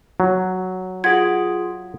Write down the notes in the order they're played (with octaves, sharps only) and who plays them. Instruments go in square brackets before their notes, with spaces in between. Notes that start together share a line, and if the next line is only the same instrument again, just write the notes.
[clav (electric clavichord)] F#3
[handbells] F4 G#4 [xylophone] F#5 G#6